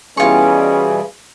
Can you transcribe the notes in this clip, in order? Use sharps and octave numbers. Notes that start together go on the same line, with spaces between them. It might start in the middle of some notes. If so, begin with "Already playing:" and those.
B2 E3 G3 C#4 F4 G#4 C#6